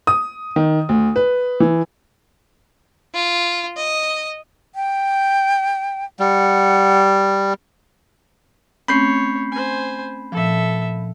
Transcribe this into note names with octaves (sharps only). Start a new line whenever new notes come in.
D#6
D#3
D2
B4
E3
F4
D#5
G5
G3 F#5
A3 C4 C#4 C#5 B5 G6 C7
C5 G#5
A#2 F3 A4 E5